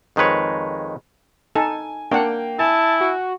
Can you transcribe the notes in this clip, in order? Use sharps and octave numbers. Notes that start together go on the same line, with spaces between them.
F2 D#3 G#3 B4 C#5
D#4 A4 G#5
A#3 D4 F#5 G5
E4 G#5 A5
F#4